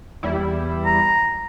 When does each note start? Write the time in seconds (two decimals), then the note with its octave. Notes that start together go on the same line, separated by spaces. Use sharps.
0.23 E2 G3 E4
0.86 A#5